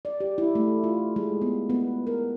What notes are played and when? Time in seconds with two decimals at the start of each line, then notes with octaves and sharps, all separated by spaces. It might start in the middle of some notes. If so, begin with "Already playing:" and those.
0.05 D5
0.20 G4
0.38 E4
0.55 A3
0.84 F4
1.16 G#3
1.42 B3
1.70 B3
2.07 A#4